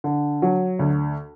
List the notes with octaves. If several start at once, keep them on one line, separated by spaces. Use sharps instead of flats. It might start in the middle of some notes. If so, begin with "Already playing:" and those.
D3
F#3
D2